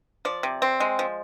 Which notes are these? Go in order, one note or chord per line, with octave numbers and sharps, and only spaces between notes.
F3 D5
C3
C4
G#3
F3